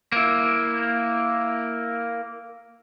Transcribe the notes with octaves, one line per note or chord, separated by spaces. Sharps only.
A#3 E4